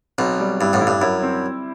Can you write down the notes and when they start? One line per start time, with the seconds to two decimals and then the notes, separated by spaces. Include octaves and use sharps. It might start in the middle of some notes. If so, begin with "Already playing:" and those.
0.18 B1 B2 C4
0.40 G3
0.61 G2 E4
0.73 A1 A2
0.81 E4
0.87 G2
1.01 F#2 E4
1.22 C4